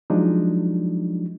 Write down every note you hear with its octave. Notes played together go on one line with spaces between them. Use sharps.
F3 F#3 G#3 D4 D#4